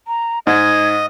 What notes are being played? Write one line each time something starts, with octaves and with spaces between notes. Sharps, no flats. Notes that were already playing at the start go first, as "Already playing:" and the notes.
A#5
G#2 D#5 G#6